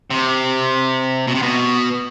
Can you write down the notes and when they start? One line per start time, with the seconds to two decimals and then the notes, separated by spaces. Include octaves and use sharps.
0.10 C3
1.27 B2
1.35 C3
1.42 B2